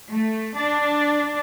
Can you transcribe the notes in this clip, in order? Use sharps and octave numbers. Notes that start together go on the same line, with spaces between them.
A3
D4